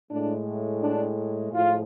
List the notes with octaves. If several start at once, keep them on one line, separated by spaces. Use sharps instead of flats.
A2 G#3 D4
D4
A2 F3 G#3 F4